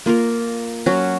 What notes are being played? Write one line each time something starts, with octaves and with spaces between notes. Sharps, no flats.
A#3 F4 A#4
F#3 C#4 F#4